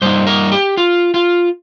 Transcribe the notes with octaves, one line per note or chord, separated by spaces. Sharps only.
G2 G3 A#3 D#4 C5
A#4
G4
F4
F4